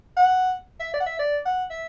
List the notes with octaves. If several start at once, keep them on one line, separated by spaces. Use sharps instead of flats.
F#5
E5
D5
F#5
E5
D5
F#5
E5